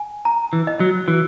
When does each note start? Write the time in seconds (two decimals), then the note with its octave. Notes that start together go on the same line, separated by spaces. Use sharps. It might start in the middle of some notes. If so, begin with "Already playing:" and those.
Already playing: G#5
0.25 A#5
0.53 E3
0.67 D#5
0.80 F#3
1.08 E3 F#4